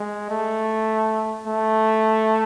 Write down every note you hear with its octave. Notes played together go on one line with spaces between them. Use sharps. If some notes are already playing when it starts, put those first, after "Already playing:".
Already playing: G#3
A3
A3